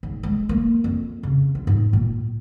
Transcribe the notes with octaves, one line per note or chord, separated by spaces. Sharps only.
G#2
G#3
A#3
F2
C#3
F4
G#2
A#2